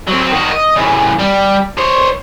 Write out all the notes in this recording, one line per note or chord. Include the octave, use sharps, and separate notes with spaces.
F#3 C4
D#3 F#4
D#5
C#3 E3
G3
C5 C#5